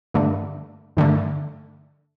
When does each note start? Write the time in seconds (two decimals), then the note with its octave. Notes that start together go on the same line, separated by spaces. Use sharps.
0.14 G2 D3 A3
0.97 G2 D3 A3